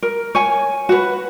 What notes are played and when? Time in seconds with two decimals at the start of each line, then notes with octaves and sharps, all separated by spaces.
0.02 A#4
0.35 C#5 G#5
0.89 F#4 B4